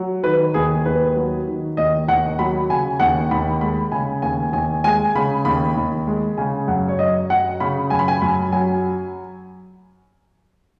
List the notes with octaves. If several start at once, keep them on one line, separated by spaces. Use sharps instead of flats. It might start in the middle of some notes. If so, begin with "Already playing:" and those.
Already playing: F#3
D#3 B4
D#2 G#4
D#2 B4
F#3
D#3
D#2 D#5
D#2 F#5
F#3 B5
C#3 G#5
D#2 F#5
D#2 B5
G#3 B5
C#3 G#5
D#2 G#5
D#2 G#5
G#3 G#5
C#3 B5
D#2 B5
D#2
G#3
C#3 G#5
F#2 F#5
C#5
F#2 D#5
F#3 F#5
C#3 B5
F#2 G#5
B5
G#5
F#2 B5
F#3 G#5